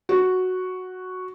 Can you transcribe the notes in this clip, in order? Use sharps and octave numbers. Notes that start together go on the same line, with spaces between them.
F#4